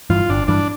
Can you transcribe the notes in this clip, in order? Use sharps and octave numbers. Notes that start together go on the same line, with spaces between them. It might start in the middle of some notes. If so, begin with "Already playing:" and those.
G2 E3 F4
G1 D4
G2 E3 D4